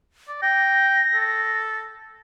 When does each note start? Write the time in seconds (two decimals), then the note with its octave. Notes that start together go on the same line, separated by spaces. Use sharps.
0.28 D5
0.42 G5 A#6
1.14 A4